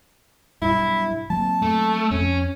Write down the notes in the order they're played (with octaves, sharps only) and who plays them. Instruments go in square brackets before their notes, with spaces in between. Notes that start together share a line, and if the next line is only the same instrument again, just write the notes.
[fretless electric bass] B1 G2 [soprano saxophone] E4
[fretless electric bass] F#3 A#3 C4 [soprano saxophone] A5
[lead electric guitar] A3
[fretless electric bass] F2 [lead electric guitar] C#4